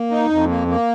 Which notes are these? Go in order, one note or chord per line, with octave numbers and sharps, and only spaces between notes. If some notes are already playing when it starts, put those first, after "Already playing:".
Already playing: A#3
D#4
F2
A#3
A#3